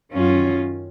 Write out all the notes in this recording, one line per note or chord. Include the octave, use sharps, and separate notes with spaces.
F#2 D#3 F#3 C#4 F4